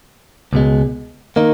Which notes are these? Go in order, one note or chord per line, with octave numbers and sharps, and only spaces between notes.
C#2 B2 G#3
D#3 A#3 D#4